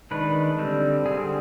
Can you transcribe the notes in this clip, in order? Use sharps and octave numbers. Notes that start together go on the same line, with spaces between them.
D#3 G#3 D4 B4
D3 G3 C4
D3 G3 C4 G#4